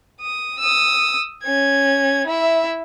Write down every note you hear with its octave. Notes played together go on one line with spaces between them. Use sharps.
D#6
D#6 E6
C#4 G#6
E4 E5